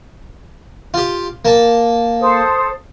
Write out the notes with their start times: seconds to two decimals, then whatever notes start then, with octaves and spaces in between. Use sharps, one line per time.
0.94 F4 G4
1.45 A#3 A5
2.20 A4 C5 D#6